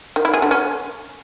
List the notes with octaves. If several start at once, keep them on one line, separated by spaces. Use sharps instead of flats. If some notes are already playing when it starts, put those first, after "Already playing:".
D#3
E4
G#4
D3
C#4